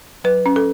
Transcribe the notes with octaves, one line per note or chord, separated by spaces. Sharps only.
F#3 B4
C#4
A4